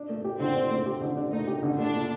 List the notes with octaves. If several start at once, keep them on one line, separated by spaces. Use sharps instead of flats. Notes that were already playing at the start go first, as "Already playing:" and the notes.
Already playing: D4
A3
G4
D3 C4
D4
A3
G4
D3
D4
A3 D#4
G4
D3
A3 D4
A#2